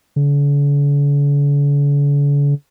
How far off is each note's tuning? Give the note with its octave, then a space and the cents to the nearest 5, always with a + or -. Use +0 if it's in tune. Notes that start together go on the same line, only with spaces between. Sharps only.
D3 -45